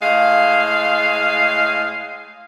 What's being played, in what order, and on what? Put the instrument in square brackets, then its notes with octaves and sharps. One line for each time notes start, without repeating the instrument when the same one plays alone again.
[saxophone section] A2 G#3 F5